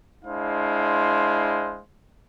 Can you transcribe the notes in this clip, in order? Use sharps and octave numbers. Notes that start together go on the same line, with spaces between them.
G#3 D4 E4 C5 F5